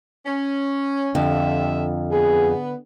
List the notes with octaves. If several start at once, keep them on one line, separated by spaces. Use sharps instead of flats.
C#4
F2 D3 G3 F4 E5
B3 G#4